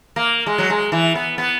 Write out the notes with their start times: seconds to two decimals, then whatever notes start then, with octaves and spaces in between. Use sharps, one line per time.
0.16 A#3
0.47 G#3
0.58 F#3
0.70 G#3
0.92 E3
1.15 B3
1.38 B3